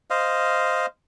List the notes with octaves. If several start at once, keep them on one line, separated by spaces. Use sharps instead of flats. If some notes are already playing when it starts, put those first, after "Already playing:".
C5 D#5 F5